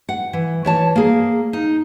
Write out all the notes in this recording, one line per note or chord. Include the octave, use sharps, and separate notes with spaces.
F#5
E3
E3 C#5 A5
A#3 G#4
D#4